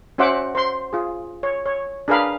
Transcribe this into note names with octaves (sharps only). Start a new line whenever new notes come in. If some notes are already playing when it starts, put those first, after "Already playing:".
C#4 F#4 C5 E5 F#5 D6
C5 C6
F4 G#4
C#5
C#5
D4 G#4 A#4 B4 F5 B5